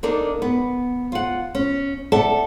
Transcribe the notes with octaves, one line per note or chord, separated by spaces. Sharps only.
A#3 D4 D#4 A4 A#4
B3
F4 F#5
C#4
A4 D5 E5 F#5 A5